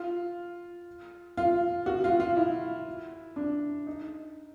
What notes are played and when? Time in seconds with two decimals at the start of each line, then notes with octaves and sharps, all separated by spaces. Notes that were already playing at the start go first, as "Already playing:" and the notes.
Already playing: F4
1.37 F4
1.86 F#4
2.04 F4
2.20 F4
2.37 E4
3.36 D4
3.87 D#4